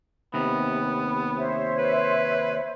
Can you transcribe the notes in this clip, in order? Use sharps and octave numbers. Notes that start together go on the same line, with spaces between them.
D#2 C3 B3
C5 C#5 E5
B4